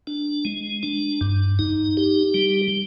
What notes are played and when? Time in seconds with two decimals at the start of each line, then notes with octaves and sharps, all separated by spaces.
0.07 D4
0.45 G#3
0.83 D4
1.21 G2
1.59 D#4
1.97 G4
2.34 G3